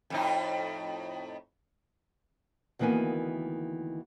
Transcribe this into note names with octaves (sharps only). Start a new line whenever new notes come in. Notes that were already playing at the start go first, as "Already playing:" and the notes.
F2 A2 D#4
D2 D#3 E3 A#3 B3 G#5